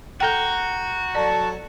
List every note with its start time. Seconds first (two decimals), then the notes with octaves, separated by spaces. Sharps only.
0.20 F#4 A4 F#5 G5 A#5 G6
1.15 F#3 A4 D5 A5